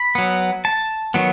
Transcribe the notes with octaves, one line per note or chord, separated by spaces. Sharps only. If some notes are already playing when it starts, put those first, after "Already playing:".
Already playing: B5
F#3 B3
A5
D#3 F#3 B3